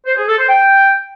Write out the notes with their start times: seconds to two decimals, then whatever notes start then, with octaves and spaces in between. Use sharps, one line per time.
0.06 C5
0.17 G#4
0.28 A4
0.38 C5
0.49 G5